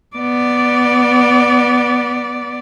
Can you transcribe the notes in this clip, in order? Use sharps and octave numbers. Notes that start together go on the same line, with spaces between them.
B3 D5